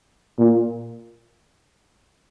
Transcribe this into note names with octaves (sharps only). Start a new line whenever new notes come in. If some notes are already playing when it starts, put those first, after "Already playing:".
A#2